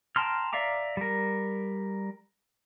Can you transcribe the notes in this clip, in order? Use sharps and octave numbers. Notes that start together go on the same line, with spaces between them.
G5 A5 A#5 C6 F6
D5 E5 F5 A#5 D6
G3 A#4